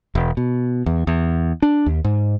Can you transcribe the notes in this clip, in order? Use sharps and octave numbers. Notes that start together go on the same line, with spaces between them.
E1
B2
E2
E2
D4
D#2
G#2